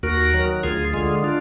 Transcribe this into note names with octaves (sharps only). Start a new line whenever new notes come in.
D#2 F#4 A#4
D#3 F#3
D2 F4 G#4
D3 G#3 F4 G#4
D4 F4